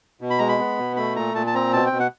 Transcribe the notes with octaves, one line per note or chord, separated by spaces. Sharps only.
B2
B5
G#3 A#5
B5
B3
B2
A3 B5
A#2 A#5
A#2 A5
A5
C4 A#5
B2 A5
G5
B2
F#5